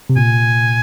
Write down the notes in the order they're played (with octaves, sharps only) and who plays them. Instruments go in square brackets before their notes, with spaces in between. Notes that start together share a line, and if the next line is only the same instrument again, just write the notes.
[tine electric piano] C3
[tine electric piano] A#2 [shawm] G#5